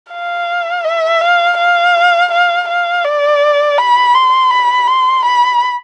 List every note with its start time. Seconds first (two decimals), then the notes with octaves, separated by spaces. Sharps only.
0.12 F5
0.84 E5
1.21 F5
1.58 F5
2.32 F5
2.68 F5
3.04 D5
3.78 B5
4.14 C6
4.51 B5
4.88 C6
5.25 B5